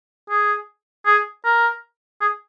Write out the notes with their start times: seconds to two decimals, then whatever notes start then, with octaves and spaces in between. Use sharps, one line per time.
0.30 G#4
1.06 G#4
1.45 A#4
2.21 G#4